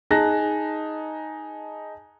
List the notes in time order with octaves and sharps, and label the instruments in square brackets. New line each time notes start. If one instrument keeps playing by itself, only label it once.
[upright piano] D#4 G#4 A5 F#6 A#6